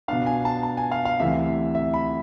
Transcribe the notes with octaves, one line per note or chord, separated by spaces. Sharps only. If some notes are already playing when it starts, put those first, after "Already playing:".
B2 B3 D4 F5
G#5
A5
A5
G#5
F5
F5
D2 C3 E3 E5
E5
B5